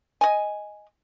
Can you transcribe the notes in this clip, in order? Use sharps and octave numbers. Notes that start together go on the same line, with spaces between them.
D#5 G#5